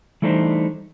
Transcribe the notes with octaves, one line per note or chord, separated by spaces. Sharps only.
E3 G3 A3 D4 D#4 C5